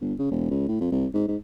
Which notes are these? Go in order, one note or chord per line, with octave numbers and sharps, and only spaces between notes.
G1
C#3
E1
C#2
A2
F2
C2
G#2
G#2